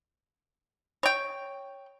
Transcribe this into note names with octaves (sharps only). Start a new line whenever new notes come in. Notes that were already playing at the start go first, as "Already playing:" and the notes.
C#5 G5